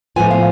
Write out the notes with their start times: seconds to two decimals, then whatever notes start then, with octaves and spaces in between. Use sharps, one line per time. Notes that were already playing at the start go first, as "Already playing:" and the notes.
0.16 A2 F3 B3 F4 G#5
0.31 F5